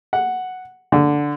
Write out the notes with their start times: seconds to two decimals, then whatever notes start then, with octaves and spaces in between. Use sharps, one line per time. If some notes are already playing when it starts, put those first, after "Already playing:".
0.13 F#5
0.92 D3